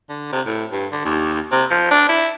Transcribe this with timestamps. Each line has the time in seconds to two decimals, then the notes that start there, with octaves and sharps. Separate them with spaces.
0.09 D3
0.32 C3
0.46 A2
0.72 G2
0.92 D3
1.05 D#2
1.52 C3
1.71 F3
1.91 D4
2.09 E4